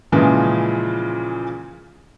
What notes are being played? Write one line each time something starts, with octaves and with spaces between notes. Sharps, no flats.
A#2 C#3 E3 F3 G#3